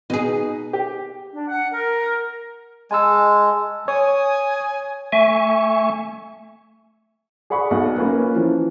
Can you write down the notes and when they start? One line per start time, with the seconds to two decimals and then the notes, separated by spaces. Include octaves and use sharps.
0.10 B2 D#4 G#4
0.73 G4
1.33 D4
1.48 F#5
1.72 A#4
2.91 G#3 G#5 A5 E6
3.88 C#5 G#5 D#6
5.12 A3 E5 G#5 C#6
7.50 G#4 D5 F#5 B5 C#6
7.71 B1 B2 F#5
7.98 A#3 C#4 F4 B4
8.35 E3 F3